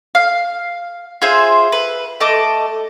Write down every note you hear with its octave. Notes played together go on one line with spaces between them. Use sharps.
F5
F4 G#4 C5 E5
B4
A3 D#5 A5 D6